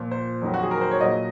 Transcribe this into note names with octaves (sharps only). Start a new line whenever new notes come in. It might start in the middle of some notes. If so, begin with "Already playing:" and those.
Already playing: A#2 F3
C5
F2 D#3 F#3
F#4
G#4
A#4
C5
C#5
A#2 F#3 D#5